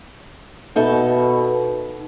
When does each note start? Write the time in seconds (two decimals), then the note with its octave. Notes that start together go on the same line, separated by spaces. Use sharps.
0.76 B2 D#4 A4 E5